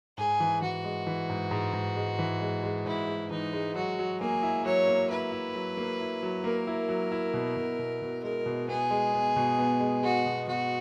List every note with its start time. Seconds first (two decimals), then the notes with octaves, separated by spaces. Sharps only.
0.17 G#2 G#4
0.40 E3
0.62 E3 F#4
0.84 G#3
1.07 E3
1.29 G#2
1.51 G#2
1.73 G#2
1.97 G#3
2.19 E3
2.41 G#3
2.63 G#3
2.86 G#2 E4
3.08 G#3
3.31 E3 D#4
3.53 G#3
3.75 F#3 F#4
3.99 F#3
4.20 A#3 G#4
4.43 E4
4.65 F#3 C#5
4.88 A#3
5.10 E4 B4
5.32 E4
5.55 F#3
5.77 A#3
6.00 E4
6.23 F#3
6.44 A#3 A#4
6.67 E4
6.89 F#3
7.12 E4
7.34 B2
7.57 B2
7.79 B2
8.02 B2
8.24 G#3 A#4
8.46 B2
8.69 B3 G#4
8.91 G#3
9.14 B3
9.36 B2
9.59 B3
9.80 G#3
10.03 G#3 F#4
10.26 B2
10.48 B2 F#4